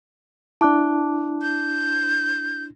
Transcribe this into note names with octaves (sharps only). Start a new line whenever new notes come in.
D4 E4 A5 D6 F#6
G6